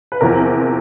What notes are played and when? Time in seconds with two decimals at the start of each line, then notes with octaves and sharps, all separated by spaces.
0.12 B4
0.21 E2 C3 F3 A#4